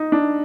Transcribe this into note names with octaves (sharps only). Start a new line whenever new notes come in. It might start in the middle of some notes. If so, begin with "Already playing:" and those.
Already playing: D#4
D4